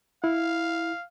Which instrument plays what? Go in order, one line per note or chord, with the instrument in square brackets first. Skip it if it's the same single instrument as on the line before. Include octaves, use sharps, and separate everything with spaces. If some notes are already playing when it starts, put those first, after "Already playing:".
[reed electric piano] E4 [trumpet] F5